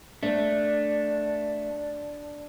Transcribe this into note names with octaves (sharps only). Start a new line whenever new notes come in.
A3 D4